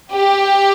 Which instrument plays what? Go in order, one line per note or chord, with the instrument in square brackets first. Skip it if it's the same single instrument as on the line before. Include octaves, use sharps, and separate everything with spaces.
[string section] G4